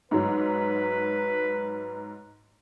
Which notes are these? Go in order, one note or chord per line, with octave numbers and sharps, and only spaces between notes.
G#2 F#3 B4